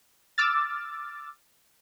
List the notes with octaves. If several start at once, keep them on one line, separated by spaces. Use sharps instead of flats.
D6 E6 F6 A6